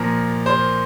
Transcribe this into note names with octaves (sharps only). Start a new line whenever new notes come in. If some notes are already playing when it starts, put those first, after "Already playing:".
Already playing: A#2 F3 A#4
C5